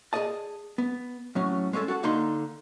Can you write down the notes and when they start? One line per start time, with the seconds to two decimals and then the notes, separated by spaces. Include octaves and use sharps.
0.13 G#4 A#4 D5 D#5 A5
0.78 B3
1.35 A2 F#3 C#4
1.73 G#3 C#4 G#4 A4 C#5
1.88 F#4 A4 F#5
2.03 D3 A#3 D#4 A#5 C6